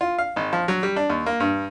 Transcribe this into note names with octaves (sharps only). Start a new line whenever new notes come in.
F4
F5
G#1
F3
F#3
G3
D4
D#2
A#3
G2